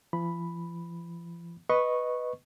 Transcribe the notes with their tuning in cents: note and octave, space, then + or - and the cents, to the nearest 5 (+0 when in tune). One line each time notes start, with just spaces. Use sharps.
F3 -45 B5 +0
B4 +0 D#5 +0 C#6 -10